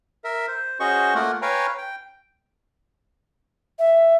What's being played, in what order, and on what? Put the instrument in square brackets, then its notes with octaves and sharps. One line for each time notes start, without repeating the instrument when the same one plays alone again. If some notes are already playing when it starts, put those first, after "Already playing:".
[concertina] A#4 E5
C5
C#4 F#4 G#4 C5 D#5 C#6
A3 A#3 F4 A#4 F#5
B4 C#5 F5 G5 G#5 A#5
G5
[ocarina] E5